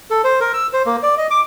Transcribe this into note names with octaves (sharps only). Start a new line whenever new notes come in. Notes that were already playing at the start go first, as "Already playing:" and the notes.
A4
C5
A#4
E6
C5
A#3
D5
D#5
D6